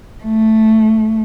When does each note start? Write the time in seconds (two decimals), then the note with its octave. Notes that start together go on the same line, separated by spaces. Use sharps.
0.23 A3